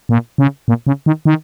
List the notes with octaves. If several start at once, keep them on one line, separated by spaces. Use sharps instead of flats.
A#2
C#3
A#2
C#3
D#3
D#3